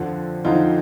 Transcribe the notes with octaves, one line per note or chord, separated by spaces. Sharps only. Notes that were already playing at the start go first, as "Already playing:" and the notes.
Already playing: F2 D3 F3
F2 D3 F3 D#4 F4